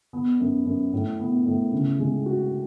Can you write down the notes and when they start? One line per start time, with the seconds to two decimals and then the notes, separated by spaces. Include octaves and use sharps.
0.13 B3
0.40 F#2
0.66 F#2
0.93 A2
1.19 B3
1.46 A2
1.72 C#3
1.99 G#3
2.26 F#4